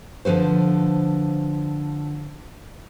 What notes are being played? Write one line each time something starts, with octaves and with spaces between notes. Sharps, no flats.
D3 F3 A4 B4 C5